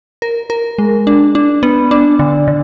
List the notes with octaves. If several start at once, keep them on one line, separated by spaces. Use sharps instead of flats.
A#4
A#4
G#3
D4
D4
B3
D4
D3
D3